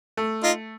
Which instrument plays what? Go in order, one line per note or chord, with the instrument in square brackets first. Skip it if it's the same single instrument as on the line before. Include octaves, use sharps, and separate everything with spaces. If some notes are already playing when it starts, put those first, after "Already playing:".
[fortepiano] A3
[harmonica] D#4 F4